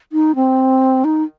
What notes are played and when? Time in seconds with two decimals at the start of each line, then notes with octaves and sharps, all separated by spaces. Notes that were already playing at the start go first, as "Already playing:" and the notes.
0.12 D#4
0.35 C4
1.04 D#4